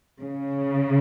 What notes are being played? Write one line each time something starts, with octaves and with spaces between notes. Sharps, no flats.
C#3